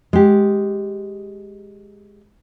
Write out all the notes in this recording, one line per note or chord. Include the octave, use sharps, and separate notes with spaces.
G#3 G4